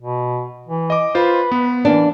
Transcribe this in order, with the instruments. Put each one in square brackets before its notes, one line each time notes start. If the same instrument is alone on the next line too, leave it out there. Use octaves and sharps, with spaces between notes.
[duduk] B2
E3
[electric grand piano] D#5 D6
[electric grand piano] F4 C5 [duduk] B4
[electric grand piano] B3
[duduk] E3 [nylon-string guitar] A#3 D4